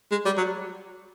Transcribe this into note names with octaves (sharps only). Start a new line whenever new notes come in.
G#3
G3
F#3